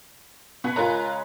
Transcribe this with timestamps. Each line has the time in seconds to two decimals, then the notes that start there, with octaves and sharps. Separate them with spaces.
0.64 B2 B4 F#5 G#5
0.76 C#3 G#3 F4 A#4 A#5